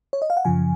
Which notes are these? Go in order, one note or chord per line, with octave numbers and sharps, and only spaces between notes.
C#5
D#5
F5
F#5
F#2 C#3 F3 G#5